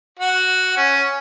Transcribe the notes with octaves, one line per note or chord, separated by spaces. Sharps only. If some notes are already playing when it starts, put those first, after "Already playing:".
F#4
C#4